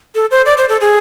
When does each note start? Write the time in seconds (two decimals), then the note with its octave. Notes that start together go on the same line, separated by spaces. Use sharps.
0.15 A4
0.31 C5
0.46 D5
0.57 C5
0.69 A4
0.81 G#4